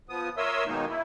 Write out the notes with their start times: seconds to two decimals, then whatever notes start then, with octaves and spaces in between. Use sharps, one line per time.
0.09 F3 B3 D#6
0.37 A#4 C#5 E5 C6 D#6 E6
0.67 B2 D#3 G#3 A#3 D#4
0.89 E4